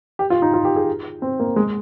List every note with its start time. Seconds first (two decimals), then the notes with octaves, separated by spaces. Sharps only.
0.19 G4
0.30 F4
0.42 D#4
0.54 F4
0.65 G4
0.76 G#4
1.22 C4
1.40 A#3
1.56 G#3